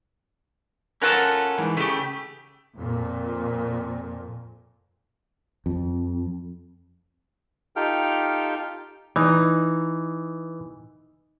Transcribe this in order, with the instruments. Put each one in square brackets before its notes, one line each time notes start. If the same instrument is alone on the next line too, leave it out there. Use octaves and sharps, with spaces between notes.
[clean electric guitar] C#4 F4 A4 [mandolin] A#4 F#5 A5
[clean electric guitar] G#2 E3
[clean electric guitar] C#3 [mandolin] A3 G4
[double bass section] F2 A#2
[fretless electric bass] F2
[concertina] D#4 F4 G4 A4 G5 F6
[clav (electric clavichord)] E3 [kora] D#4